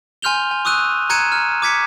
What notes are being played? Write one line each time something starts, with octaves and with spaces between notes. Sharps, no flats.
G#5 C6 F6 G6 F7 G7
G#5
C#6 D#6 E6 F#6 D#7
A#5 F#6 G#6 C#7 D#7 E7
F6
D6 G#6 B6 C#7